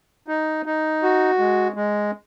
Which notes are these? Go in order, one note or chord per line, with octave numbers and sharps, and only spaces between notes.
D#4
D#4
F#4
G#3
G#3